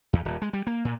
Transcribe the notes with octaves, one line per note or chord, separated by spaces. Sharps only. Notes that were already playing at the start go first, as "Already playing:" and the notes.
E2
D#1
G#3
G3
A#3
A#2